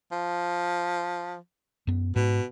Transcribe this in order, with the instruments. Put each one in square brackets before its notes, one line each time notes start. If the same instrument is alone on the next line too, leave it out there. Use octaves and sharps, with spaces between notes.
[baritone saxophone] F3
[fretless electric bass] F#2 B3
[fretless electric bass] G#2 [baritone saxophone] B2